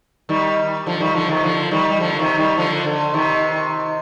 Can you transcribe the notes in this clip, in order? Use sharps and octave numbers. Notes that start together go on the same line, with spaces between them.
D#3 G3
D3 F3
D#3 G3
D3 F3
C3 D#3
D3 F3
D#3 G3
G3
D3 F3
C3 D#3
D#3 G3
D3 F3
D3
C3 D#3